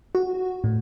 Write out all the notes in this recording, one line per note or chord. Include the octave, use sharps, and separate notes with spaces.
F#4
A2